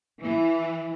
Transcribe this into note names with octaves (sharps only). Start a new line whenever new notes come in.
E3